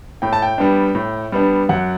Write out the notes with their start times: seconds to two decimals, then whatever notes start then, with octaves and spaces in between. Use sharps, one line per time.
0.22 A2 G5
0.33 A5
0.42 G5
0.58 G3 B3 D4
0.95 A2
1.32 G3 B3 D4
1.69 F#2 F#5